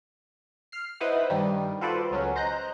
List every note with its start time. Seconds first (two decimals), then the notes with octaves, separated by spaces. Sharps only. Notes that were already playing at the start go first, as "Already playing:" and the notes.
0.72 F6 C7
1.00 D#4 E4 B4 C5 F#5
1.30 G2 D#3 G3
1.81 F4 F#4 A4 B4 C5 D5
2.11 C#2 F#3 C#4
2.36 C5 D#5 A#5 F#6 G6